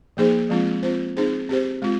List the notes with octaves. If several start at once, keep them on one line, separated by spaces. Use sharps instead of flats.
F3 A#3 D#4 G#4 C5
F3 G#3 C4 F4
C4 F4 C5
C4 D#4 G#4 C5
C4 G4 C5
G#3 C4 F4